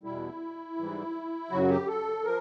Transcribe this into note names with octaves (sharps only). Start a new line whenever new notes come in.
E2 B2 G3 E4
G#2 E3 G3
F#2 C#3 F#3 F#4
G4
A4
F3 A#4